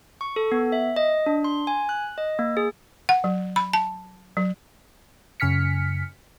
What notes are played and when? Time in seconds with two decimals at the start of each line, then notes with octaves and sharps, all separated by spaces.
0.21 C#6
0.36 A4
0.52 B3
0.72 E5
0.96 D#5
1.26 D4
1.44 C6
1.67 G#5
1.89 F#6
2.18 D#5
2.39 A#3
2.57 G#4
3.09 F#5
3.24 F#3
3.56 B5
3.73 A5
4.37 F#3
5.40 F#2 C#3 G#5 F6 B6 C#7